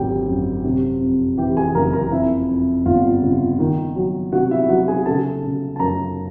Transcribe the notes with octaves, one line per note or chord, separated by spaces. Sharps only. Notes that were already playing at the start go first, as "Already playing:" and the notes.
Already playing: G#1 D3 F#3 G4 G5
F#2
C3
F2
E3 G4 G5
G#4 G#5
F#1 A#4 A#5
A#4 A#5
F2 E4 E5
F2
G1 F4 F5
C#3
D#3
F#3
C3 F#4 F#5
E4 E5
F#3 F#4 F#5
G#4 G#5
C#3 A4 A5
C#3
A5
F#2 A#4 A#5